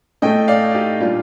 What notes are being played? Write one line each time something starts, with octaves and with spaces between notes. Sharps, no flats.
A2 A3 D#5 G5
D5 F5
D#4 G4
A#2 G3 D4 F4